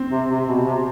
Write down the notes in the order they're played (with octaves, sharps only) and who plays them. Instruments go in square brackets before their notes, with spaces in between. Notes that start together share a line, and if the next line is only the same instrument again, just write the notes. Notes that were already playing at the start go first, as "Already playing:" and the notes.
Already playing: [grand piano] C4
[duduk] C3
C3
B2
C3